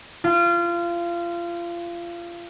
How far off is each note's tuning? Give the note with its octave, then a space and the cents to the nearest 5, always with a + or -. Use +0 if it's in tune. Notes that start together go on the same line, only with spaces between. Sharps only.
F4 -25